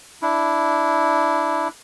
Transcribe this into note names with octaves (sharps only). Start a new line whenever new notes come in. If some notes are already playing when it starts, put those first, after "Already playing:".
D4 E4